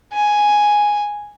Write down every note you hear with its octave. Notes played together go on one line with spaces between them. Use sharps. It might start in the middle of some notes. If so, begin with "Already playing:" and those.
G#5